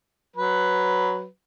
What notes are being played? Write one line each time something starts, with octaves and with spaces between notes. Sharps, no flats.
F#3 B4